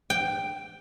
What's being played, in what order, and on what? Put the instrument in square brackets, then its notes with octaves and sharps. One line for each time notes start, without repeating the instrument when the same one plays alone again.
[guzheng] G5